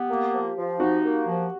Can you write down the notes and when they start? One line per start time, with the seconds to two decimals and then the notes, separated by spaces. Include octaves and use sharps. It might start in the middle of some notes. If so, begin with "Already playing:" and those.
Already playing: B3 G4
0.09 A#3
0.33 F3
0.57 F3
0.79 D#4 F#4
1.04 A#3
1.27 F3